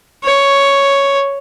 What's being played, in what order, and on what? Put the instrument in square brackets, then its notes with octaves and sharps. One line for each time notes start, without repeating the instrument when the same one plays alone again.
[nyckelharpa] C#5